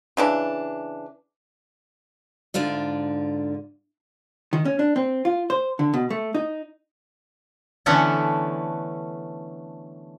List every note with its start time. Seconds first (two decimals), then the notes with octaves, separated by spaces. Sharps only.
0.17 C#3 E3 D4
2.54 G#2 D3 F4 D5
4.53 D#3
4.65 C#4
4.79 D4
4.96 C4
5.25 F4
5.50 C5
5.79 D3
5.94 B2
6.10 A3
6.34 D#4
7.86 D3 E3 A3 B3 C#4 E4